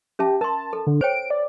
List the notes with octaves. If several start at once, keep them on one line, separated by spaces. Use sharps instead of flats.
C#4 G4 E5 A5
A#4 A5 C6
A4
D3
C5 C#5 G5 D7
D5